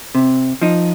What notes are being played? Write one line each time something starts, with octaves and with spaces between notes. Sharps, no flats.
C3
F3 D#4